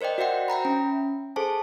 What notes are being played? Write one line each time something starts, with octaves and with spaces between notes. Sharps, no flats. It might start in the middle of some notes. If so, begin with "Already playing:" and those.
A#4 C5 D5 D#5 G5
F#4 C5 E5 F#5 G5
E5 G5 A#5 B5
C#4
G#4 A4 C5 G#5 A5